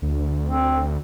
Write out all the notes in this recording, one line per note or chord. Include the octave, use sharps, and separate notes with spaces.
D2
C4